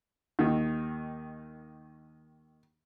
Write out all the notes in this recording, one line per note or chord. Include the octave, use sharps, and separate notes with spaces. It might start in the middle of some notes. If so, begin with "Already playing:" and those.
D#2 D#3